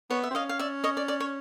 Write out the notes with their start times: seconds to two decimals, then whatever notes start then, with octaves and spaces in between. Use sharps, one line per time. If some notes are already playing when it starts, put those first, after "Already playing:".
0.10 B3 C#5
0.23 E5
0.31 C4
0.35 C#4 D#5 F5
0.49 F5
0.59 D5 E5
0.84 C#5 D#5
0.97 D5
1.08 D5
1.20 C#5